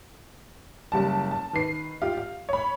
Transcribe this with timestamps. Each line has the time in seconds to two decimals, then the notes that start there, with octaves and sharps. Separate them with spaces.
0.92 F#1 G3 A5
1.31 A5
1.53 D#3 B4 C7
2.02 F4 G4 F5
2.18 F5
2.49 C#5 B5